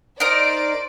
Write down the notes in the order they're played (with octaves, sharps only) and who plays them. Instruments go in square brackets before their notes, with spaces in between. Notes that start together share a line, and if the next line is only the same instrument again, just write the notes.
[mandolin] D#4 A#4 [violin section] C5 D5 [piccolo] D7